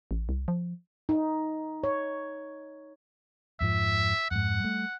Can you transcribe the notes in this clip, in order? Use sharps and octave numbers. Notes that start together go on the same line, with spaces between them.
A1
C2
F3
D#4
C#5
F2 G#2 F3 E5
F2 G#2 F#5
G3 A3